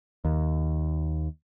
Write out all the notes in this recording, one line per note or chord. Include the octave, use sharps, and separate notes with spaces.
D#2